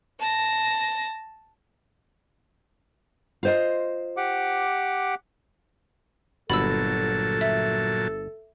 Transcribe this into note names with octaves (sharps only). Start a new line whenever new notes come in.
A5 A#6
F4 C5 D#5
G4 F#5 D6
G1 A#2 F#3 F#4 A4 A5 B5 E6
E5